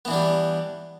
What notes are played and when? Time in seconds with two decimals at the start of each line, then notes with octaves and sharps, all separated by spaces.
0.05 B3
0.08 E3
0.11 D4
0.13 G3